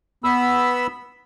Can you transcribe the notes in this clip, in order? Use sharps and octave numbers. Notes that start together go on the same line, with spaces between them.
B3 B5 E6